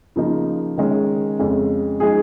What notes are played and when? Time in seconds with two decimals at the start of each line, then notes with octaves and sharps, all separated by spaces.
0.16 C#3 F3 A#3 D#4
0.77 D#3 G#3 C#4
1.39 F2 C#3 G#3 C#4
2.00 F3 G#3 D#4 G#4